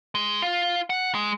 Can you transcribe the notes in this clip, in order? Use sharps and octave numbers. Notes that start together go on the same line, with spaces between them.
G#3
F4
F#5
G#3